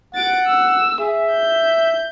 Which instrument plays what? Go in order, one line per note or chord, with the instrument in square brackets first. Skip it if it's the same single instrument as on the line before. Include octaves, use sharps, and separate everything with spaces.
[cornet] F#5 [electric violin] A6 D7
[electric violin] E6
[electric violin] G#4 [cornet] E5
[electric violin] G6